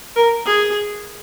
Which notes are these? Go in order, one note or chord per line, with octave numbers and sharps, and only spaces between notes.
A#4
G#4